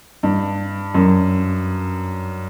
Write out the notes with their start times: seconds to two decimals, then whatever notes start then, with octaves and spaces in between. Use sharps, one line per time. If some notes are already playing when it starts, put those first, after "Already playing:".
0.23 G2
0.95 F#2